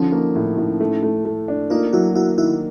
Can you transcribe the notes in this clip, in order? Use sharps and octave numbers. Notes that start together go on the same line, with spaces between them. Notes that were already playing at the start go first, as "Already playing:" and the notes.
Already playing: D3 F3 C#4 D#4
A#3
A2
A2
A3
A3
A3
D4
A#3 D#4 F4
F#3 E4 F#4
A#3 E4 F#4
D#3 E4 F#4